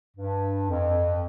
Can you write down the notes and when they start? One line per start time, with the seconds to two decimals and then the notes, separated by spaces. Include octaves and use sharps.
0.17 G2
0.69 F2